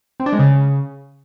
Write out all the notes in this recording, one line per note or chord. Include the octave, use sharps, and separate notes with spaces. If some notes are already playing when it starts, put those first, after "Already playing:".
C4
D4
G#3
C#3